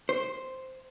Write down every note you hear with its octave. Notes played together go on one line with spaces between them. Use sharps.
C5